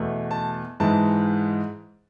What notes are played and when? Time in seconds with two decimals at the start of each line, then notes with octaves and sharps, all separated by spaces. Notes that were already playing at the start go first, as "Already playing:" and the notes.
Already playing: E2 B2 A3
0.31 A5
0.80 G#2 E3 G#3 A5